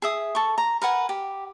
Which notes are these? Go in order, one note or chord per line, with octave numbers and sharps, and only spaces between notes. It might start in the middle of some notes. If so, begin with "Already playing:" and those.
G#4 E5 D#6
A4 C#6
A#5
A#4 B4 F#5 G#5
G4